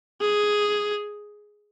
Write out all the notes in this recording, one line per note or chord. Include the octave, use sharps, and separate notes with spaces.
G#4